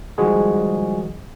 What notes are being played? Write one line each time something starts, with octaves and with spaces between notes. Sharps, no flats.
D#3 F3 G3 G#3 F#4 G#4